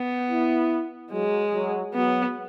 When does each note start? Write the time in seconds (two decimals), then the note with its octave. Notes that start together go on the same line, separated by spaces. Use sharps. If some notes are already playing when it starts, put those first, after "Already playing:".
Already playing: B3
0.30 E4
1.12 F#3 G#3
1.54 F#3
1.94 F#3 B3